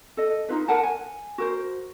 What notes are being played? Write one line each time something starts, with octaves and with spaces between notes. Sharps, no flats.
A4 D#5
D#4 F4 B4
A#4 B4 F#5 A5
G#5
F#4 A#4 C5